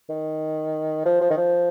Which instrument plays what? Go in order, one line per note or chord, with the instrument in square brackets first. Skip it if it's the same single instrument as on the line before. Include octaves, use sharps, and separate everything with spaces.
[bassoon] D#3
F3
F3
D#3
F3